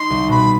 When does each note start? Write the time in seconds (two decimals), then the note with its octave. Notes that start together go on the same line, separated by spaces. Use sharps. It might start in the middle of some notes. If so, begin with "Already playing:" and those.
Already playing: D#4 C6
0.10 C2
0.29 B2 B5